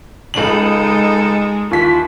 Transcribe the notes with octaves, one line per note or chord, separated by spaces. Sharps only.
C#2 G#3 D#4 A4 F#7
D#2 E3 F4 B6